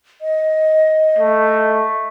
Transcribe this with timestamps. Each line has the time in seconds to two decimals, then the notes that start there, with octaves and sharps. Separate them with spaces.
0.21 D#5
1.19 A3